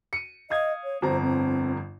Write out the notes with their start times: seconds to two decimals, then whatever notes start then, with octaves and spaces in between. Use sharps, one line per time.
0.13 C#7 D#7
0.50 D#5 F5 D#6 G#6
0.84 C#5
1.02 G1 F2 C5 A#5
1.23 C4